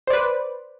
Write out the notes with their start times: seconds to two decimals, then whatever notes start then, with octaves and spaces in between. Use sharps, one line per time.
0.07 C5
0.10 D5
0.13 B4